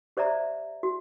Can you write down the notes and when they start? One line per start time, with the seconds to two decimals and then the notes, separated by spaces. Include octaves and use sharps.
0.17 G4 C5 D5 E5 A#5
0.83 F#4